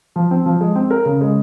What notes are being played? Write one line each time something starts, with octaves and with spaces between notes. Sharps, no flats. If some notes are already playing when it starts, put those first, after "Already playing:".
F3
C4
F3
G#3
C4
A#4
C#3
G#3